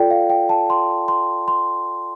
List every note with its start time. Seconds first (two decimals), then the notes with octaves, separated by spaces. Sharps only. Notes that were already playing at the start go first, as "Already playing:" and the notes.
Already playing: F4 A4 D5 G5
0.11 F5
0.30 G5
0.49 A5
0.70 C6
1.08 C6
1.48 C6